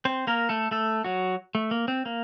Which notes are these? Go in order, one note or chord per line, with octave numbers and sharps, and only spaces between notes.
C4 C5
A#3 A#4
A3 A4
A3 A4
F#3 F#4
A3
A#3
C4
A#3